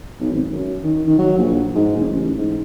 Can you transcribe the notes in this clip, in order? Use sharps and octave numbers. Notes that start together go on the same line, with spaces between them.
B1
G#1
F#2
D#3
D#3
F#3
A#1
G#2
F#1
A1
G#2